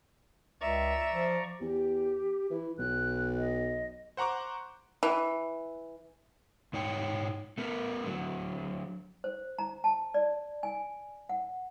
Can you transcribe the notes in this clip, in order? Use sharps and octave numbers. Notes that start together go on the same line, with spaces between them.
C#2 D5 E5 A#5 C#6
F3
E2 G4
E3 E4
B1 F#6
D#5
C5 F#5 A#5 C#6 D6
E3
G#2 D#4 C#5 G5
A3 B3 A#4 B4
D3 F#3
C5
A#5
A5
D5
G#5
F#5